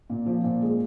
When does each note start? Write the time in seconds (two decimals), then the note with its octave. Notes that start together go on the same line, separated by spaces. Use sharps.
0.10 A#2
0.26 F3
0.44 A#2
0.62 G#3